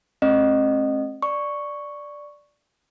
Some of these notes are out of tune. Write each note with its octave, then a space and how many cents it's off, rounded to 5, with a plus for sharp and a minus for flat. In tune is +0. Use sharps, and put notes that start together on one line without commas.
A3 -45 C4 +45 D#5 -20
D5 +0 C#6 +0